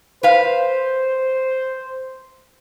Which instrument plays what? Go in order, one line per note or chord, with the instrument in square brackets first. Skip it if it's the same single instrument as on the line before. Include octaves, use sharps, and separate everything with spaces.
[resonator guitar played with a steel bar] B4 F5 [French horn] C5